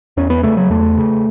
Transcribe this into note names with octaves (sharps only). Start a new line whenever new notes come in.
E2 C#4
B3
C#3 A3
F#3
E2 A3
C#3